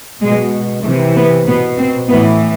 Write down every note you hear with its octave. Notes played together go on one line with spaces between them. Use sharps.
B2 G#3
C3 E3 A3
B3
B2 B3
C4
A2 E3 B3